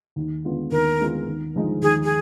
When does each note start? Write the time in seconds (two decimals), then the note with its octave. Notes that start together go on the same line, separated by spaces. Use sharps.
0.16 D#2
0.44 D3 G#3 B3 F4
0.71 D#2 A#4
0.99 D3 G#3 B3 F4
1.27 D#2
1.54 D3 F3 G#3 D#4
1.82 D#2 G#4
2.04 G#4